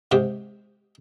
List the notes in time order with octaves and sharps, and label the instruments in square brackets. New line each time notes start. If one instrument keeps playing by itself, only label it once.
[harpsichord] G#2 C3 G4